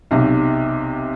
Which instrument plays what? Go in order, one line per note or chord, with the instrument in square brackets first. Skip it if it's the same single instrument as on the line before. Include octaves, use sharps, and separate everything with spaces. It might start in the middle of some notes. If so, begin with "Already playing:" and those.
[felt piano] B1 C3